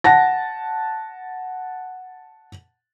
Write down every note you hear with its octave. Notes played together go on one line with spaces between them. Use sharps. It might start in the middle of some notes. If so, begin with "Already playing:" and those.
F#5 A5 A#6